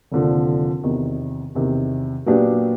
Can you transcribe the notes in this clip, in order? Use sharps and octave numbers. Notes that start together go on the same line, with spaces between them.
F1 D#2 D3 F3
E2 C3 D#3
E2 C3 D#3
A#2 F#3 B3 D4 G4